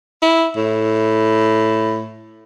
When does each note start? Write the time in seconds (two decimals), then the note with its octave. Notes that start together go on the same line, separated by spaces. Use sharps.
0.22 E4
0.57 A2